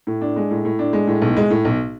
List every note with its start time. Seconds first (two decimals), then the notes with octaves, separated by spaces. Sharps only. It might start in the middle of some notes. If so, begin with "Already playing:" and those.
0.07 A2
0.21 D4
0.36 G#3
0.51 A2
0.65 A2
0.79 D4
0.93 G#3
1.08 A2
1.22 B1
1.37 G#3
1.50 A2
1.65 B1